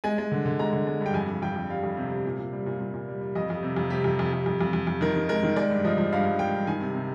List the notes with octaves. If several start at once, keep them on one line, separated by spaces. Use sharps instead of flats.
G#3 G#5
G#3
D3
D3
G#3 A#5
D3
G#3
G2
G5
F2 G#5
F2
F2 G5
F2
G3 F5
F2
C3
C3
A#2
A#2
G3
A#2
A#2
A#2
G3
G3
F2 D#5
F2
C3
F2
C3 G4
F2
F2
F2
F2
F2
F2
F2
D#3 A#4
D#3
G#3 A#4
D#3
G#3 D5
G2
F3 D#5
F3
G2 F5
G2
G#3 G5
G2
D#3 G#5
C3
C3